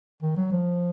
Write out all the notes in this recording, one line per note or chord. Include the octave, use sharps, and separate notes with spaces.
D#3
F#3
F3